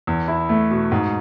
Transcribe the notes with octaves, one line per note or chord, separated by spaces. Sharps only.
E2
E4
A3
B2
G#2